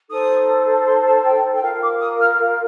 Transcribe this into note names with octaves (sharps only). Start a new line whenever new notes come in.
D#4 A4 C5 D#6
C6
A5
G5
G5
F4 A#4 F5
D6
D#6
F6